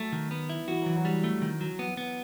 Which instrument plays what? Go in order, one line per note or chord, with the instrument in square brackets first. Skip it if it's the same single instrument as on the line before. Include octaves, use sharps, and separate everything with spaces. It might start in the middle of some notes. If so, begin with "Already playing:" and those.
Already playing: [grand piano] F#3 [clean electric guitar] A3
[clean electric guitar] D#3
B3
E4
[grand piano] E3 [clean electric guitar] F#4
[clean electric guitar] E3 [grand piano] F#3
[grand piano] F#3
[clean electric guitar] G3
A3
D#3
F#3
B3
B3